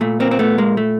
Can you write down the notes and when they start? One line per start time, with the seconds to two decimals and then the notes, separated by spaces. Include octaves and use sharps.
0.01 A#2 A3
0.20 A#3 C4
0.31 C4
0.39 A3 B3
0.58 G#3 A#3
0.77 A3